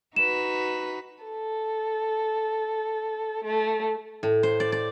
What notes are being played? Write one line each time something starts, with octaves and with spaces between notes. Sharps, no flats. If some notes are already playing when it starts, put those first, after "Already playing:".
D#4 F#4 B4 E7
A4
A3
A2
C5
D5
D5